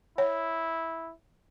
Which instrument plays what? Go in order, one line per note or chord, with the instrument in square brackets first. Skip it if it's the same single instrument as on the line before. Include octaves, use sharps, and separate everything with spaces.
[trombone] E4 [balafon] C#5